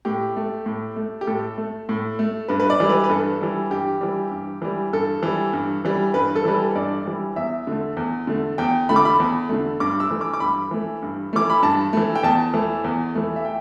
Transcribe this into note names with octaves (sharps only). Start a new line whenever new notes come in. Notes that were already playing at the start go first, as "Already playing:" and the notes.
A2 G4
A3
A2
A3
G4
A2 A4
A3
A2
A3
G2 B4
B4
D5
E3 G3
B4
B4
G2 A4
E3 G3
G2 G4
E3 G3
G2
E3 G3
G2 A4
E3 G3
G2
E3 G3
G2 B4
A4
E3 G3 B4
A4
G2 D5
E3 G3
E2 E5
D3 A3
E2
D3 A3
E2 G5
D3 A3 B5
D6
B5
E2
D3 A3
G2 D6
E6
E3 A3
D6
D6
G2 B5
E3 A3
G2
E3 A3 D6
B5
G2 A5
E3 A3
G5
E2 A5
E3 A3
E2
E3 A3
E5
G5